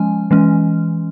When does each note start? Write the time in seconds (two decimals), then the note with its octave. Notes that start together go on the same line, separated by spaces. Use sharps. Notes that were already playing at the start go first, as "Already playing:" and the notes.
Already playing: F3 G#3 C#4 G#5
0.31 E3 G#3 C#4